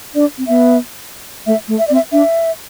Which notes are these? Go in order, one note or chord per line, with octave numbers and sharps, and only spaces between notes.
D4 D5
C4
B3 E5
A3 E5
A3
E5
C4 D5
E5
D4 E5